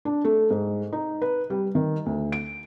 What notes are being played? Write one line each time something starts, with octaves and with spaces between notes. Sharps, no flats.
D4
A3
G#2
D#4
B4
G3
D#3
D2
D7